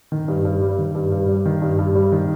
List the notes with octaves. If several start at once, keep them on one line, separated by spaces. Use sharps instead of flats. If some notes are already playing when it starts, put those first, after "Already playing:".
D#3
G2
G2
G3
D#3
G2
G2
G3
D#3
G2
G2
G3
D#3